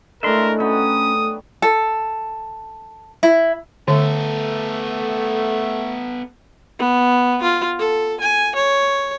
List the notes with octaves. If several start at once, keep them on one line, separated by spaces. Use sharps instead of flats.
A2 G#3 A3 D4 A4 A#4 E5 C6
F#3 B3 C#4 G5 D#6
A4
E4
D3 A3 B3 A4
B3
F4
A4
G#5
C#5